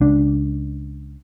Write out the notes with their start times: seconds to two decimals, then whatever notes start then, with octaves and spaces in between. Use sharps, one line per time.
0.01 C#2 D4